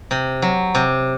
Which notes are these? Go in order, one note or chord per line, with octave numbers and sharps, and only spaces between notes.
C3
F#3
C3